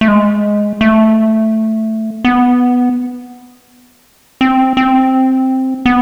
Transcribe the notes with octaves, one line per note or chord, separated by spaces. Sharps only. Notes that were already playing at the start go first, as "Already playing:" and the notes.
A3
G#3
A3
B3
C4
C4
B3